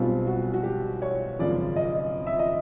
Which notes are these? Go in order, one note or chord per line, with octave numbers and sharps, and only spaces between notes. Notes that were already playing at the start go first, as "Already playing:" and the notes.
Already playing: B1 B2 G3 C4 F4
F#4
F#4
G4
C#5
G#1 F#2 C#3 F3 D5
D#5
E5
D#5